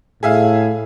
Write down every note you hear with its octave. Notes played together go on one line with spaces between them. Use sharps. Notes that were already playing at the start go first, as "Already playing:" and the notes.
A2 G#4 E5 F5